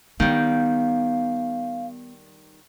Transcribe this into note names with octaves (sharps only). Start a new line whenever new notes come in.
D#3 G3 B3 F5